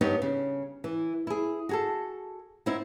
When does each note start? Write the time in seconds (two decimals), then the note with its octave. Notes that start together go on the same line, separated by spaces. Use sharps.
0.01 G2 B3 D#4 G4 C#5
0.22 C#3
0.84 E3
1.27 E4 G#4
1.69 F#4 G#4 A4
2.66 B3 C4 D#4 E4